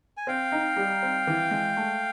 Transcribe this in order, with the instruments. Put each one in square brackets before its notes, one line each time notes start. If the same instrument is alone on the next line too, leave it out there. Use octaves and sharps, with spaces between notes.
[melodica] G#5
[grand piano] C4 [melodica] F5 G5
[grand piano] D#4
G3
C4
E3
G#3
A3